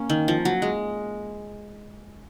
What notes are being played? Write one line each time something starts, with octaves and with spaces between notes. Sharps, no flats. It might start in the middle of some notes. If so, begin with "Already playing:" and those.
Already playing: A#3 C#4
D#3
F3
F#3
G#3